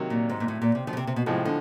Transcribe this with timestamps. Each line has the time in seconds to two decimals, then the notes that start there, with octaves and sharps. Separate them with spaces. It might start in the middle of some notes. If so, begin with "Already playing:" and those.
Already playing: C3 D#3 F#3 A#3
0.10 A#2
0.30 G#2
0.40 A#2
0.48 A2
0.62 A#2
0.75 C3
0.87 D#3 F3
0.93 C#3
0.97 C3
1.07 C3
1.16 B2
1.26 A2 C3 F3 G#3
1.45 D3